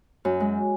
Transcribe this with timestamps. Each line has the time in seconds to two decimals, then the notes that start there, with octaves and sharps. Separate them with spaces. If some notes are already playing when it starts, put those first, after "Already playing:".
0.25 F#2
0.40 G#3